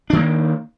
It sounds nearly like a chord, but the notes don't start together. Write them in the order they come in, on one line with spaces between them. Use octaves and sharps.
D4 D#3 A#3